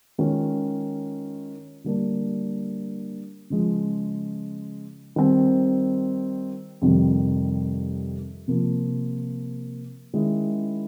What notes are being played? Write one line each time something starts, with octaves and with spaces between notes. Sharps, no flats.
D#3 G#3 C#4 F4
D3 G3 A#3 D4
C#3 F3 G#3
D#3 G3 C4
F2 C3 D#3 G3
C3 F3 A#3
D#3 G#3 C#4 E4